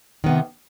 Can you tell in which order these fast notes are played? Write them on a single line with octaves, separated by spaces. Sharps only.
D#3 B3 C3